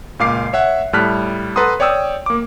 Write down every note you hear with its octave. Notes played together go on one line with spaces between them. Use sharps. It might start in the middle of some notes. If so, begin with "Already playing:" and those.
C#2 A#2 F5 D6 C7
C#5 E5 F#5
A2 G3 A5 F6 F#6 B6
A4 B4 F#5 A#5 C6 D#6
C#5 D5 G5 D#6 E6
A#3 D6